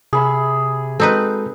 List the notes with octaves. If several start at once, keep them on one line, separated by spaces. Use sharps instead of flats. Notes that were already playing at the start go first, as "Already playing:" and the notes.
C3 G#4 B5 E6
G#3 C4 D#4 F#4 A4 B4